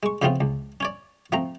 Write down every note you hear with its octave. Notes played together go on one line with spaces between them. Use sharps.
G#3 C#6
F2 C#3 A3 B3 C4 F4
C#2
C#4 C#5 D5
F3 A3 C4 A#5